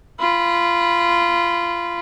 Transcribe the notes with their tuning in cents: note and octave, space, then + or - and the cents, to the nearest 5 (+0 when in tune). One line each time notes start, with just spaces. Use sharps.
F4 -20 B5 -5